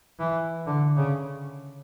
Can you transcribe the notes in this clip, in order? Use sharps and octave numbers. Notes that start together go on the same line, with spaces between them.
E3
D3
C#3